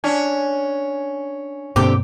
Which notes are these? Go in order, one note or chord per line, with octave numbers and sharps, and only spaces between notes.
C#4 D4 G#5
G2 B2 D3 A#3 C4 G4 G5 D6